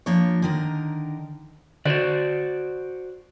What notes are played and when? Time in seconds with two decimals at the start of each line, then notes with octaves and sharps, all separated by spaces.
0.06 F3 A#3 D4 F4 C#5
0.42 D3 D#3 A#4
1.85 D3 F#4 C5 D5 E7